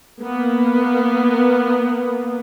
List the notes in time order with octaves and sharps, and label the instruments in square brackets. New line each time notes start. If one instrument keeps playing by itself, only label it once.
[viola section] A#3 B3